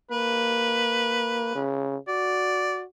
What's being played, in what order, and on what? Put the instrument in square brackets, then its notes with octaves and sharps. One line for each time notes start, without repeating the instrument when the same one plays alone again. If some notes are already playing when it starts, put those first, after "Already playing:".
[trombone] A#3 [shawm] B4
[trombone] C#3
[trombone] F#4 [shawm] D5